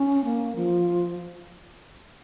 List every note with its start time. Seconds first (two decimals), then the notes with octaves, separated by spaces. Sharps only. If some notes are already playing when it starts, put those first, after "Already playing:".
Already playing: C#4
0.25 A#3
0.56 F3